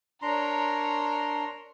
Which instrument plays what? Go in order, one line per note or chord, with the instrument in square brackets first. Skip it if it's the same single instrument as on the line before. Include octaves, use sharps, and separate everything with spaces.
[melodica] D4 A#5 C6 [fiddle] A#4 C#5